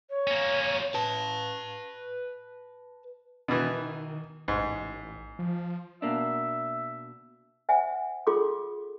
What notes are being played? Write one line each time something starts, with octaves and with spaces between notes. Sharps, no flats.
C#5
A#3 C#4
B4 A5
B2 D#3 E3
A1 G#2
F3
B2 A#3 D4 E5
C5 E5 F#5 G#5
F4 G#4 A4 C6 D6